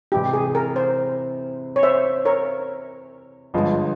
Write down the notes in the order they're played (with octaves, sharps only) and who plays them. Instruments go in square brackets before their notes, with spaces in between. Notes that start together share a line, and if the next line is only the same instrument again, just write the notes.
[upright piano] C3 E3 G#3 E4 [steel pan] G4
[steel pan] G#4
A#4
C5
C#5
C5 E5
A#4 C#5
[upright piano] G1 G2 F3 G#3